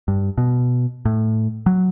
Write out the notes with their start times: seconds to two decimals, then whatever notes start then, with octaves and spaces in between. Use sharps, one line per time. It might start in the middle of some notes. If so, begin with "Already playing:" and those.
0.08 G2
0.38 B2
1.05 A2
1.66 F#3